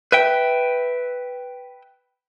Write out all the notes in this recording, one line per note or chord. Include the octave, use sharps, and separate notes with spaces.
B4 E5 G5